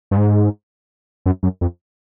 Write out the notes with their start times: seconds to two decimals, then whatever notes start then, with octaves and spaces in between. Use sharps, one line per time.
0.11 G2
0.17 G#2
1.26 F#2
1.43 F#2
1.61 F2